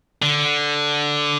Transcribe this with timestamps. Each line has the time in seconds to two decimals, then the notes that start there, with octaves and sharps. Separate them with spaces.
0.22 D3